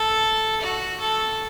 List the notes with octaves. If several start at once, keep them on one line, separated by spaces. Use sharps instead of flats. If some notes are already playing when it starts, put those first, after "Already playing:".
Already playing: A4
F#4
A4